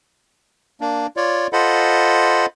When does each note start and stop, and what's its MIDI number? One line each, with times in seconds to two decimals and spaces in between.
0.81 1.07 58
0.81 1.07 62
1.17 1.47 65
1.17 1.47 73
1.17 1.47 74
1.53 2.46 65
1.53 2.46 69
1.53 2.46 72
1.53 2.46 75
1.53 2.46 78
1.53 2.46 83